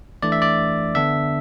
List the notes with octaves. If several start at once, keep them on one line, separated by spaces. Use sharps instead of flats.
E3 A3 D4 D5
E5
D5
D3 B3 D4 E5